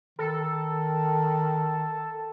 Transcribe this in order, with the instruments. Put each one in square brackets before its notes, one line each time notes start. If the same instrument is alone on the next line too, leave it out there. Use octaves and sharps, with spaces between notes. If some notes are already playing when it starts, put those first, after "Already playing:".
[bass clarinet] D#3 [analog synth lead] A4